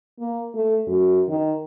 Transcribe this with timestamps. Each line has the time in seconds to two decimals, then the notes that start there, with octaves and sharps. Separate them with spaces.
0.19 A#3
0.55 A3
0.87 F#2
1.29 D#3